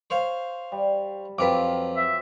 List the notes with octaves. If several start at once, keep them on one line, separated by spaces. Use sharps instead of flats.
C5 C#5 F5
G3
F2 F3 F#3 C4 F4 B4 F5 D6
E5